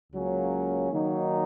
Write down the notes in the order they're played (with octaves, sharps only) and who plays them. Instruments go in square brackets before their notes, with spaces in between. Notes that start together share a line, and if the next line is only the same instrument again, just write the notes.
[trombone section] C#2 C#3 F#3 A#3 C#4
D#3 F#3 A#3 D#4